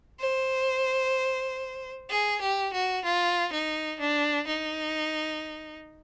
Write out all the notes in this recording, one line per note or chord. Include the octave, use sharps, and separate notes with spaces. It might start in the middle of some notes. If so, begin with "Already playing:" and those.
C5
G#4
G4
F#4
F4
D#4
D4
D#4